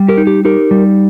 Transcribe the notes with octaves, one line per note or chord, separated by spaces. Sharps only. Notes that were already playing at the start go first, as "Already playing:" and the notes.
Already playing: G3
G4 A#4
D#4
G4
D#4 G4 A#4
G3